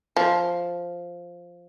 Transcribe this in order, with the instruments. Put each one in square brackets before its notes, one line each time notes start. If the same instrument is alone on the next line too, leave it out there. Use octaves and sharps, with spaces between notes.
[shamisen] F3